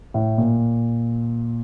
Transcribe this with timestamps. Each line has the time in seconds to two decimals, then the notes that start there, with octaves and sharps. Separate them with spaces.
0.14 A2
0.38 A#2